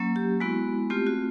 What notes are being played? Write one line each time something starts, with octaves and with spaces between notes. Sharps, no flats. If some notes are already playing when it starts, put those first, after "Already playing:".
Already playing: F#3 A#3 C#4
G4
G#3 B3 E4 F#4
A3 C4 F4 G4
F#4